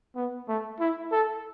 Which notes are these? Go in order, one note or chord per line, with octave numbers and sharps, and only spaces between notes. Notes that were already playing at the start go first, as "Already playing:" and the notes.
B3
A3
E4
A4